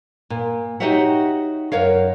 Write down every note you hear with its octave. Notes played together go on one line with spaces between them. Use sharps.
A#2
D#4 F#4 G4 C#5 E5 F#5
F#2 A#4 C#5 F5